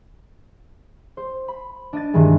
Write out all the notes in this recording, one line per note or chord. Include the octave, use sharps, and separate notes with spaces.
C5
B5
D4 D#5 A6
C2 G2 D#3 E3 G3 G#3